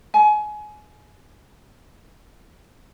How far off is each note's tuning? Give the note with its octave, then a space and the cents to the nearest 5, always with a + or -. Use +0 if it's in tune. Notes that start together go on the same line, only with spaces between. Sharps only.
G#5 +25